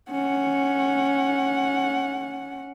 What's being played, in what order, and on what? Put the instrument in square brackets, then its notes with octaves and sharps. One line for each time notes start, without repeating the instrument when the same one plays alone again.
[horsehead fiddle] C#4 F#5